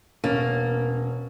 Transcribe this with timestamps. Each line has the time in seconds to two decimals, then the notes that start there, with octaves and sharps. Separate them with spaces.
0.24 E1 A#3 C#4 A6